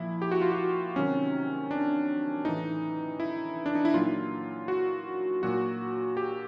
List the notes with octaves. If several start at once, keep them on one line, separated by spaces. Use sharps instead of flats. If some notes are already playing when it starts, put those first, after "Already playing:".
Already playing: A#2 F3 E4
G4
F#4
F4
F#4
C3 D#3 F#3 C#4
D4
A2 E3 D#4
E4
D4
D#4
E4
A#2 F#3 F4
F#4
A#2 F#3 F#4
G4